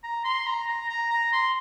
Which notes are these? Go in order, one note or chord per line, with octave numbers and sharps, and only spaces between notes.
A#5
C6
A#5
A#5
A#5
A#5
C6